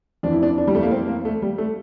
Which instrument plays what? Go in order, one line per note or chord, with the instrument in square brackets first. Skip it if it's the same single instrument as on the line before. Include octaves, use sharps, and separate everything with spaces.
[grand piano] F2 E3 D4
E4
D4
D4
G3
A3
A#3
C4
A#3
A3
G3
A3